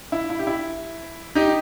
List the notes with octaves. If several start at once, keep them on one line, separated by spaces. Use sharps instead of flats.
E4
E4
G4
E4
D#4 G4